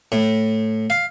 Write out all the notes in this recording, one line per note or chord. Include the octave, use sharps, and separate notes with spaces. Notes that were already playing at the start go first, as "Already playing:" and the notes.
A2
F5